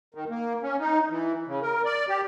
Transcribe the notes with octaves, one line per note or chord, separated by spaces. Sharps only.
D#3
A#3
C#4
D#4
E3
C#3
A#4
D5
G4